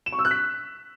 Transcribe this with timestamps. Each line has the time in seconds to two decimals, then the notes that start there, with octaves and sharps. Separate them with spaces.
0.06 E7
0.12 C#6
0.19 E6
0.25 F#6
0.31 B6